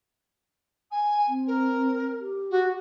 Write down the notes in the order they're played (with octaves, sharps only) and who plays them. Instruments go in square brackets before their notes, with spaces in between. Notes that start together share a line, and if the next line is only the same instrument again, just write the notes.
[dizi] G#5
[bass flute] C4
[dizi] A#4
[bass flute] G4
[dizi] F#4